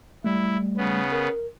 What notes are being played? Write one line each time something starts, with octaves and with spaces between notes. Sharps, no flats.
G3 A3 E4
C#3 B3
A#4